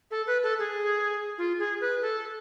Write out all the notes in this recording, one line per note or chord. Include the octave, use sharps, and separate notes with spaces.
A4
B4
A4
G#4
F4
G#4
B4
A4